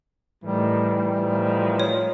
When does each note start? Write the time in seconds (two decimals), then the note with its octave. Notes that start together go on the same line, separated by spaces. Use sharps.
0.44 A2 D#3 E3 G3
1.17 A2 D#3 F3
1.80 C#5